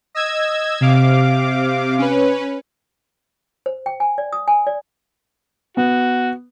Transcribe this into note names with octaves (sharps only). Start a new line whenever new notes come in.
D#5 E6 G#6
C3 F5 D6
C#4 B4
C5
G5
G#5
D5
D#6
G#5
D5
B3 F#4